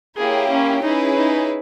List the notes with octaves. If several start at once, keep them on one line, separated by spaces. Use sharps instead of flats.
A#3 E4 G4 G#4 C#5
C#4
C#4 D#4 E4 G#4 B4
D#4